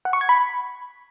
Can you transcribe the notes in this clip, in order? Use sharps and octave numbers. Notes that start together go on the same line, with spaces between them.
F#5
C#6
G#6
B5